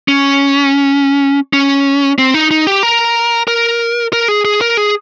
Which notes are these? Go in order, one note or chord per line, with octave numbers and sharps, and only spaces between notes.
C#4
C#4
C4
D#4
D#4
G4
A#4
A#4
A#4
G#4
G#4
A#4
G#4